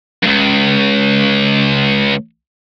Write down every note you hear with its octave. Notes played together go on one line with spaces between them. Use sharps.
C#2 G2